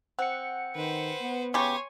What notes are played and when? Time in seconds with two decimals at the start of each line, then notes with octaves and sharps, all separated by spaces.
0.19 C4 F#5 C#7
0.76 D#3 B4 C5
1.22 B3
1.54 C#3 G4 C#5 G#5 C6 C#6